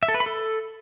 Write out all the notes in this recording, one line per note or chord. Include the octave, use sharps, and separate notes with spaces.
E5
A4
B4
B5
A4